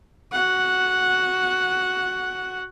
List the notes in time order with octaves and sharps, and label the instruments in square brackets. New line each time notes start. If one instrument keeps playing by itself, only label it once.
[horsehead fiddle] F#4 F#5